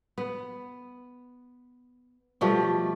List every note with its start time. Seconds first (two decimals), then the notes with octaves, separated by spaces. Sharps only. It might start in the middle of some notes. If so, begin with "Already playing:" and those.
0.18 B3
2.41 B2 F3 G3 A3